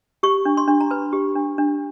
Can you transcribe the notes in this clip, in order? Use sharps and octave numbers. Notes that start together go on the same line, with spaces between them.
G4 C#6
D4
C6
D4
A#5
B4 B5
G4
D4
D4